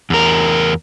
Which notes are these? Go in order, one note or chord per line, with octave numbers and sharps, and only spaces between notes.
E2 A#4